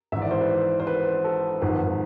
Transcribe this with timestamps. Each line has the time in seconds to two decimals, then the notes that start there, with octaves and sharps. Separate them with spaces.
0.12 G#1 G#2 E3 E5
0.22 D5
0.31 C5
0.41 B4
0.80 C5
0.87 B4
1.24 A4
1.61 G#1 G#2 F3 B4